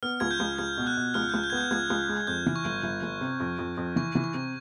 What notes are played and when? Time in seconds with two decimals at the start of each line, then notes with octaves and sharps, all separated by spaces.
0.03 B3 F6
0.20 C#2 G#6
0.31 G6
0.40 C#2
0.58 C#2 G#6
0.77 B2
0.87 F#6
0.97 B2
1.14 C#2 F6
1.29 C#2 G6
1.44 G6
1.50 B3 G#6
1.57 G6
1.71 C#2 G#6
1.90 C#2
2.09 G#3
2.27 F2 G6
2.46 E3
2.56 C#6
2.65 G1
2.83 G1
3.03 G1
3.21 C3
3.40 F2
3.59 F2
3.77 F2
3.96 E3 C#6
4.15 E3
4.24 C#6
4.34 C3